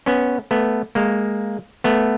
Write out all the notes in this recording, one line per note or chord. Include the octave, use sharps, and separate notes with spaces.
B3 C#4
A3 B3
G#3 A#3
A3 B3